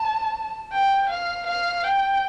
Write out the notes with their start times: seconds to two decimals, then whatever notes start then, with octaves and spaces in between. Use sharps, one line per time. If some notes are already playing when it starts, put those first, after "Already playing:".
Already playing: A5
0.72 G5
1.10 F5
1.47 F5
1.84 G5